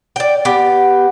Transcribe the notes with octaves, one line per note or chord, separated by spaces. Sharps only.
D5 G5
B3 G4